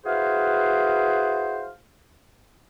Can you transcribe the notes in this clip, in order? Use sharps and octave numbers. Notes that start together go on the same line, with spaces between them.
E4 F#4 G#4 B4 C5 F5